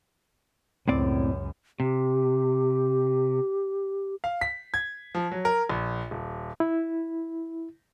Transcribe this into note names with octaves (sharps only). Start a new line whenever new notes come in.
C#2 F#2 A2 C4 D5
C3 G4
F5
B6
G#6
F3
F#3
A#4
A#1
D#1
E4